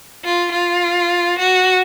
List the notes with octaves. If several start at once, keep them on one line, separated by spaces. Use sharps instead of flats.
F4
F4
F#4